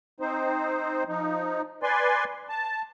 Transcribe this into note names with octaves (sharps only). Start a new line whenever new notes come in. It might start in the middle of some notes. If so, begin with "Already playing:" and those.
C4 D#4 C5
F3 D#4
B4 D5 G#5 C6
A5